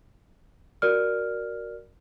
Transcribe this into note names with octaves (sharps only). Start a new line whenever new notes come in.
F#4 A#4 D5 F6